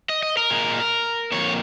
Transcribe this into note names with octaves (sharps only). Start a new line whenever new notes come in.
D#5
D#5
A#4
A#2 G#3
F2 D#3 A#3 C#5